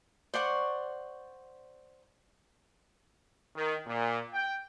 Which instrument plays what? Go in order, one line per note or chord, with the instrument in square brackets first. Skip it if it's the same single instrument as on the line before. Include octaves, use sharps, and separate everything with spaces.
[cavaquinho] C5 D5 F#5 C#6
[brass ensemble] D#3
A#2
G5